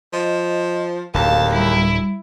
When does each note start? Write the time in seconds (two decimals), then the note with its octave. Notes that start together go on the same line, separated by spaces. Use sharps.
0.13 F3 D#5
1.14 D1 D#2 F5 A5
1.53 G3 E4